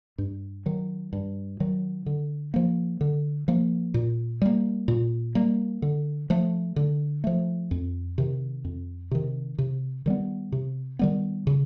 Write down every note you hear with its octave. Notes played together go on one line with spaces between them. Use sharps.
G2
D#3 F#3
G2
D#3 F#3
D3
F3 A#3
D3
F3 A#3
A#2
G3 A#3
A#2
G3 A#3
D3
F3 A3
D3
F3 A3
F2
C3 D#3
F2
C3 D#3
C3
D#3 G3 B3
C3
D#3 G3 B3
C#3